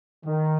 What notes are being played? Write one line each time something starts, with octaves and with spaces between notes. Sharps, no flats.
D#3